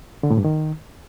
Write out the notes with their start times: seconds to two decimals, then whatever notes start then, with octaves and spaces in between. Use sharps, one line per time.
0.23 D3
0.30 A2
0.37 G2
0.45 D#3